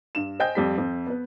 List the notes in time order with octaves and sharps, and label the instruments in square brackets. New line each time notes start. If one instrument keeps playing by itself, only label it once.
[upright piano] G2 E7
C5 D#5 G5 G#5 G6
F2 G3 B6
F2
B3 B4